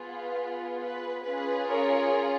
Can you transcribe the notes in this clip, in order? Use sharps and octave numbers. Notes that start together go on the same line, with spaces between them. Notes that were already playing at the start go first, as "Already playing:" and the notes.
Already playing: B3 F4 G#4 B4
B4
C#4 F4 G#4 B4
A#4 C#5